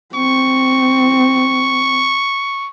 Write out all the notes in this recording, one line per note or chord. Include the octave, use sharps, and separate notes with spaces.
C4 C#6